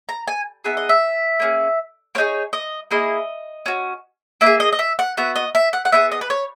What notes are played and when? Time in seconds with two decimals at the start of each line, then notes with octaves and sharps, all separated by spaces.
0.09 A#5
0.28 G#5
0.64 B3 D#4 G#4 E5
0.77 D#5
0.89 E5
1.40 A#3 C#4 E4 G#4
2.15 A#3 D#4 G#4 C#5
2.53 D#5
2.91 A#3 E4 G#4 D#5
3.66 C#4 F#4
4.41 A#3 D#4 E5
4.46 G#4
4.60 D#5
4.73 D#5
4.79 E5
4.99 F#5
5.17 B3 F#4 E5
5.36 D#5
5.55 E5
5.73 F#5
5.85 F#5
5.92 B3 E4 G#4 E5
6.12 D#5
6.21 B4
6.30 C#5